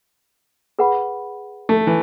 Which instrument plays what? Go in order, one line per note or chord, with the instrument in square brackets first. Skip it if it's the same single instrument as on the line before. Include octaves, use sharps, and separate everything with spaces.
[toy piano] G#4 B4 F#5 B5
[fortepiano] A3
E3